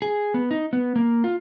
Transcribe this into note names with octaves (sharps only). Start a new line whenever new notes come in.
G#4
B3
D#4
B3
A#3
F4